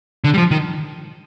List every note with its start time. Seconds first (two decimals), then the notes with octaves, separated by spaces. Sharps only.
0.24 D3
0.34 G3
0.38 F3
0.51 D#3